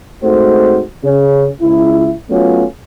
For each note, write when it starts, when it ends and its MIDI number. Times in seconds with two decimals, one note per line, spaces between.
0.23 0.81 44
0.23 0.81 57
0.23 0.81 60
0.23 0.81 66
0.23 0.81 72
1.04 1.49 49
1.04 1.49 61
1.61 2.12 37
1.61 2.12 64
2.30 2.64 54
2.30 2.64 57
2.30 2.64 59
2.30 2.64 61
2.30 2.64 65